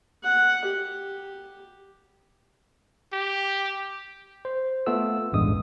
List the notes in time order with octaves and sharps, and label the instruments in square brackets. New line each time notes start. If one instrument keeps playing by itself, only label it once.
[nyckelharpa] F#5
G4
[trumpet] G4
[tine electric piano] C5
A3 B3 F4 A4 E6
A1 E2 G2 G#3 D#6